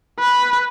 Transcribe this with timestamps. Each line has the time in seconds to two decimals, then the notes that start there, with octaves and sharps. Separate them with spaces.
0.19 B4